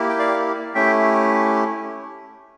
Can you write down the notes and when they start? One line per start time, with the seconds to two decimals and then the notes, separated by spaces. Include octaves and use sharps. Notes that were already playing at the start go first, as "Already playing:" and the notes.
Already playing: A#3 E4 G4
0.09 G5
0.19 D5 F5
0.75 A3 C#4 E4 G4 E5 G5